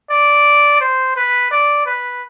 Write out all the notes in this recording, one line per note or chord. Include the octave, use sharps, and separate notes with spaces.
D5
C5
B4
D5
B4